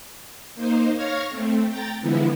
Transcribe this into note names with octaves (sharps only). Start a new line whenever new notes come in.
A#3 D#4 C5
C#5 F5 C#6 F6 G#6 A#6
A3 C4
G5 A#5 A6
D3 E3 F3 G#3 B3 E4